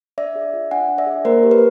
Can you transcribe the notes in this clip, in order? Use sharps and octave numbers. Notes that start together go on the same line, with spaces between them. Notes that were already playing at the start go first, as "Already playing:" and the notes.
D4 D5 E5
G#4
F4
D4 F#5 G#5
D4
D5 E5
G#4
A#3 A#4 C5
G4
B4